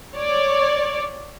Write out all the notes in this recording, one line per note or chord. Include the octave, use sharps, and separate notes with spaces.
C#5 D5